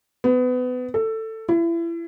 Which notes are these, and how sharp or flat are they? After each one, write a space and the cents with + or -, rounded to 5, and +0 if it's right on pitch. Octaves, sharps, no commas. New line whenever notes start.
B3 +25
A4 +15
E4 +30